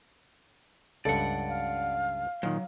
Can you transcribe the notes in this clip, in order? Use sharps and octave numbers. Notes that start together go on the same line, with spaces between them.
C#2 G2 A4 D5 F#5
F5
A#2 D#3 F#3